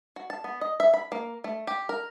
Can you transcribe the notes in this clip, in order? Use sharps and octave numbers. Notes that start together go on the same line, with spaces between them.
F#4
A5
B3
D#5
E5
B5
A#3
A3
G4
A#4